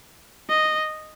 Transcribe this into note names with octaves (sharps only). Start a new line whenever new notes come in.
D#5